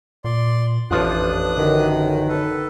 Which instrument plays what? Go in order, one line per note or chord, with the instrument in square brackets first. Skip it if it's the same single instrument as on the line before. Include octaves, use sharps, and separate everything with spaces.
[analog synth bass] A#2 [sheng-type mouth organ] D5 C6
[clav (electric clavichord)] A1 F3 F4 [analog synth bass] F2 [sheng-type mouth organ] D4 D#6 F#6
[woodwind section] F#2 D#3 [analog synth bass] D3
[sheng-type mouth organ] A4 B4